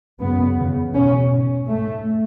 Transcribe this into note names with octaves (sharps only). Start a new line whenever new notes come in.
F#2 C#3 B3
E2 C#3
E2 B2 C#4
G#2
G#2 A3